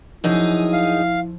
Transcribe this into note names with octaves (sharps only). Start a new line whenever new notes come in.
F#2 F3 D#4 E4 G#4 E6
F5